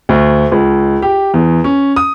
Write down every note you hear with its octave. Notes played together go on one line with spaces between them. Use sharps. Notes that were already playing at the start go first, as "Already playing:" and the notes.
D2
C#2
G4
E2
C#4
D#6